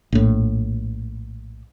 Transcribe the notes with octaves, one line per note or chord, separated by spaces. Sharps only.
A#1 A2